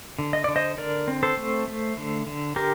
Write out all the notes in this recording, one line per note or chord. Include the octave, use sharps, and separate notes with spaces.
D3
D#5
D3 D5
C5 D#5
D3 A#4 D5
C4
A4 C5
A3
A3
D3
D3
D3 G4 A#4